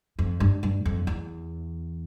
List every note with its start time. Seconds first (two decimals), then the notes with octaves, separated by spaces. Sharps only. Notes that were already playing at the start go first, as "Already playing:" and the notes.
0.19 F2
0.40 G2
0.63 G2
0.85 F2
1.07 E2